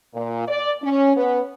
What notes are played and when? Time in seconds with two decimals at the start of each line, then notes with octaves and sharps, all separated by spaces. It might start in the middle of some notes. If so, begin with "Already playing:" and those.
0.14 A#2
0.48 D5
0.82 C#4
1.17 B3